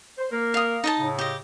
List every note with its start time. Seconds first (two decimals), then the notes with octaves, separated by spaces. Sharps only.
0.18 C5
0.31 A#3 A#4
0.54 F5 D#6
0.84 D#4 D#5 A5
0.99 A2 C#3
1.19 G4 D#5